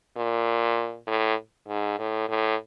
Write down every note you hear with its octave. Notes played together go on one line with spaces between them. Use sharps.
A#2
A2
G#2
A2
A2